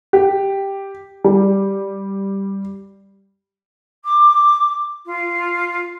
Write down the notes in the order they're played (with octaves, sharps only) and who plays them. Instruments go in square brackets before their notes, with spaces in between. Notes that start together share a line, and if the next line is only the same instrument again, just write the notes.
[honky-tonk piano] G4
G3
[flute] D6
F4